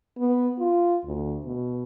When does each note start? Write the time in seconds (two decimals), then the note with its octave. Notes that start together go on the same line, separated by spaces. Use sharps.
0.19 B3
0.59 F4
1.04 D2
1.45 B2